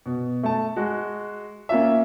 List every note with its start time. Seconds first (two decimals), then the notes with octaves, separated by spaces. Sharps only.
0.06 B2
0.43 A3 A5
0.76 G#3 F#4
1.69 A#3 C#4 F4 E5